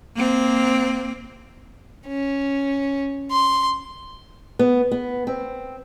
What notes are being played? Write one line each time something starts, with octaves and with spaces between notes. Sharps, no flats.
A#3 C4
C#4
C6
B3
B3
C4